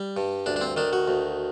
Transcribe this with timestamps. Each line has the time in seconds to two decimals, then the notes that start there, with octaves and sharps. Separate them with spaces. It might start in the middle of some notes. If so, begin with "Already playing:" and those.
Already playing: G3
0.17 G2
0.46 D2 D4
0.56 D4
0.61 C4
0.76 D#3 D4
0.93 F#4
1.08 D2